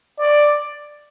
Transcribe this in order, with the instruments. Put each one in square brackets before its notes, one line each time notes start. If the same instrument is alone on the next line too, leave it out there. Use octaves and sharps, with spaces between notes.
[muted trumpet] D5